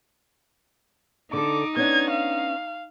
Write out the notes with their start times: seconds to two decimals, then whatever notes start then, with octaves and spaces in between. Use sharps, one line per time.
1.33 D3 D#4 A4 D6
1.76 B3 C#4 D4 G#6
2.11 F5